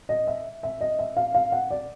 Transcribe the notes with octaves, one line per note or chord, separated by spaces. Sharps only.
D#5
E5
E5
D#5
E5
F5
F5
F#5
D5